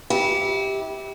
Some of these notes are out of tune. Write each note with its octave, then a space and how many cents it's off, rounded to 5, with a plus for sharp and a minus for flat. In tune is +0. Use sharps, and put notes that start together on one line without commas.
E4 -30 G4 +0